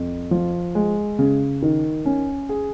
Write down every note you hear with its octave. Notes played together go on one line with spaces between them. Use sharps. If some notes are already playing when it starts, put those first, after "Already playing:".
Already playing: F2
F3
G#3
C#3
D#3
C#4
G#4